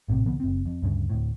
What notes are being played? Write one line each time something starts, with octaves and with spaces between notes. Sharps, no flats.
A#1 A2 C3
C2 D3 F3 B3
F#1 C4
F2
D2 G2 C#3
D2 A2